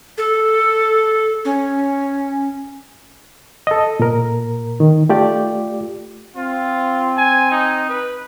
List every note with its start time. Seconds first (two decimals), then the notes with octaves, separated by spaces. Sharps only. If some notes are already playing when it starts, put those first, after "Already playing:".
0.18 A4
1.45 C#4
3.67 A4 D#5
4.00 A#2 A#4
4.80 D#3
5.09 A3 F4 G4 D5
6.36 C4 F4
7.17 G#5
7.51 D#4
7.89 B4